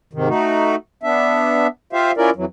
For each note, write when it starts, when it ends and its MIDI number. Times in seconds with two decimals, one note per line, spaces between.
0.13 0.29 44
0.13 0.29 48
0.13 0.29 51
0.29 0.75 57
0.29 0.75 63
0.29 0.75 66
1.03 1.67 59
1.03 1.67 62
1.03 1.67 76
1.93 2.12 65
1.93 2.12 67
1.93 2.12 72
1.93 2.12 76
1.93 2.12 77
2.17 2.30 61
2.17 2.30 64
2.17 2.30 65
2.17 2.30 70
2.17 2.30 74
2.36 2.45 41
2.36 2.45 52
2.36 2.45 54